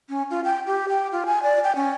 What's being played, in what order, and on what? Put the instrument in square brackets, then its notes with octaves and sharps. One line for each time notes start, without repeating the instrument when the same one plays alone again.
[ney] C#4
F4
G5
G4
G5
F4
G#5
D5
G5
C#4